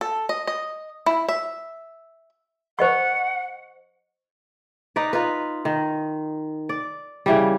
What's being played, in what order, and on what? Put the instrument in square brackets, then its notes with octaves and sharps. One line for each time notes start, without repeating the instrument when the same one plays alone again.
[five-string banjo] A4
D#5
D#5
E4
E5
[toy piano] C5 D#5 C#6 [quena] F#5
[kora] D#4 B4 D5
D#4 F4 B4
D#3
D5
C#3 E3 G3